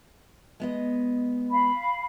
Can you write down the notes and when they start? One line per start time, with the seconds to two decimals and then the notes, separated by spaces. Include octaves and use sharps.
0.60 G#3 B3 D#5
1.51 F5 B5